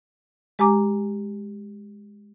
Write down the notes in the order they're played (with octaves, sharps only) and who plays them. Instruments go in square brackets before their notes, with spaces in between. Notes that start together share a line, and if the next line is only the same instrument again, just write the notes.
[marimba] G#3 G4 G#5 A#5 D6